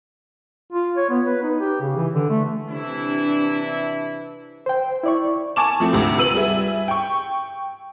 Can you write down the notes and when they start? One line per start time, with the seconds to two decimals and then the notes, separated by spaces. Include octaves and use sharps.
0.73 F4
0.97 C#5
1.09 B3
1.26 B4
1.43 D#4
1.60 G4
1.81 C#3
1.96 E3
2.15 D3
2.30 A3
2.69 C3 E3 D4 E4
4.66 C5 G5
5.03 E4 D5 C#6
5.56 G#5 A5 C#6 D6 E7
5.80 F3 A3 C4
5.93 D2 G#2 C3
6.18 F4 B4 E6 D#7 F#7
6.35 G3 G#4 E5
6.88 G5 C#6